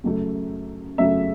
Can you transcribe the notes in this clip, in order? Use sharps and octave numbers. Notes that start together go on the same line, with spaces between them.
F#2 C#3 F#3 A3
F#2 C#3 F#3 A3 E5